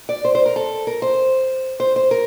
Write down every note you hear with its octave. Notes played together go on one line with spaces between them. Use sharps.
D5
C5
C5
A#4
A4
A#4
C5
C5
C5
A#4